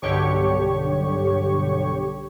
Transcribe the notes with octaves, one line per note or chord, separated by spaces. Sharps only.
B1 G2 D3 G4 C#5 C#6